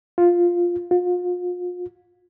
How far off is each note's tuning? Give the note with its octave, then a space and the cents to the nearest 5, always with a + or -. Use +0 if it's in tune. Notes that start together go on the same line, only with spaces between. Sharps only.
F4 +0
F4 +35